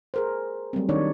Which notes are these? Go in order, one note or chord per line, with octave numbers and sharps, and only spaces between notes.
G#4 A#4 C5
F#3 G3 A3 C4
D#3 D4 D#4 C#5 D5